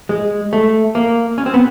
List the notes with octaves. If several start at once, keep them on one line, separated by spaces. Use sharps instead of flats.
G#3
A3
A#3
C#4
C4
B3